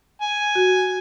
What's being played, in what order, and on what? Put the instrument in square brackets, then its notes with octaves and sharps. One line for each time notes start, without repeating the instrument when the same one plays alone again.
[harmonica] G#5
[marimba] F#4